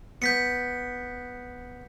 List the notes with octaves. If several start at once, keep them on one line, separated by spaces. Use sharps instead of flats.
B3 G6 B6 C#7